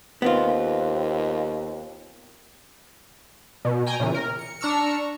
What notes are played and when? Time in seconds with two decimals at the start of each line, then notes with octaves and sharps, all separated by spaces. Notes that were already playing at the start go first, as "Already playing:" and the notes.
0.22 D#2 B3 C4 F4
3.65 B2
3.86 G5 G#5 A#5
4.00 A#2 C#3 E3
4.14 A#4
4.39 C#7
4.60 D4 A#5 C#6 E6 F6 C#7